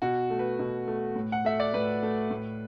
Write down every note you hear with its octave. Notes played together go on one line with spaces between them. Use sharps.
B2 F#4
A3
B4
B2
A3
A2
F#5
A3 E5
D5
A2 B4
A3
A2